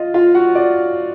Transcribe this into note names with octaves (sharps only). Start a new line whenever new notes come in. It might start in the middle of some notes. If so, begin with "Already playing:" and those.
Already playing: F4 D#5 F5
F4 F5
F#4 F#5
D5